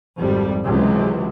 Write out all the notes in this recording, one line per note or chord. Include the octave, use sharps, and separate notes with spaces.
G#1 F2 G3
C#2 C3 E3 F#3